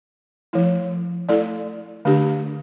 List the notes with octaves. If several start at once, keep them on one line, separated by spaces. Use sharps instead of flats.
F3 A3 E4
A3 E4 A4 D5
D3 A3 D4 G4